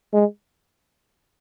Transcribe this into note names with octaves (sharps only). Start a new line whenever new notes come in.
G#3